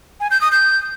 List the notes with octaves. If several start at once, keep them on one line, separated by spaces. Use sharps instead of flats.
G#5
G6
D#6
G6